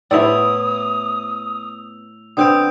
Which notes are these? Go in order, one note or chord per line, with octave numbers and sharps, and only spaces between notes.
A2 B3 E4 C5 D5 D#6 E6 F7
D3 B3 C4 D#6 G6 D7